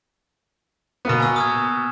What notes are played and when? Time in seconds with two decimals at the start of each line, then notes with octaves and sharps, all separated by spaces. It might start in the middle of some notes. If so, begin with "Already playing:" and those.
1.05 B2 A#3 B3
1.20 G#5 C#6 E6
1.36 D#6 F6 G#6